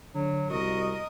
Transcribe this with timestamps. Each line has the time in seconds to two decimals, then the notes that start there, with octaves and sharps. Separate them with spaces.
0.15 D3 F#3
0.50 C2 F#4 A#4 D#5